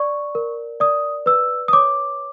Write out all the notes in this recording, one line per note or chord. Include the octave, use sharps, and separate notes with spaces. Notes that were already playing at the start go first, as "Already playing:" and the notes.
Already playing: D5 C#6
A#4
D5 D#6
B4 E6
D#6
C#5 D6